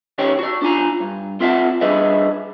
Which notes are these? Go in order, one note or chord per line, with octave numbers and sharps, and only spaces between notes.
C#2 D#3 C#4 G4 C#5 G5
F#4 D5
D4 F4 G#5 A#5
G2
C4 F4 E5 F#5 G#5 A5
G3 D4 G#4 B4 D#5 E5